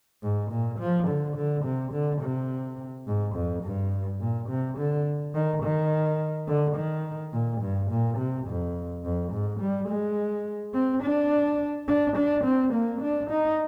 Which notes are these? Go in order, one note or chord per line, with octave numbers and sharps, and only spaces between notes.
G#2
A#2
F3
D3
D3
C3
D3
C3
G#2
F2
G2
A#2
C3
D3
D#3
D#3
D3
D#3
A#2
G2
A#2
C3
F2
F2
G#2
G3
G#3
C4
D4
D4
D4
C4
A#3
D4
D#4